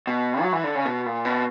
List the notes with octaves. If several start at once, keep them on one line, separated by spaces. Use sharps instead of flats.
B2
F#3
E3
D3
C#3
B2
A#2
B2